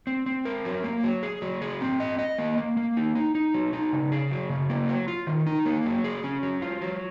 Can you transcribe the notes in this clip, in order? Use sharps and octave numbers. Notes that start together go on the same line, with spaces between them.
C4
C4
A#4
F#3
A#3
F#3
G#4
F#3
G#4
C4
D#5
D#5
A#3
A#3
A#3
D#4
D#4
D#4
F#3
D#4
C#3
G#4
F#3
C#3
A#3
F#3
F4
D#3
D#4
A#3
F#3
G#4
C#4
F#3
F4
F#3